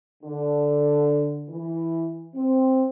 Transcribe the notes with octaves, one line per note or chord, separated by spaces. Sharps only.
D3
E3
C4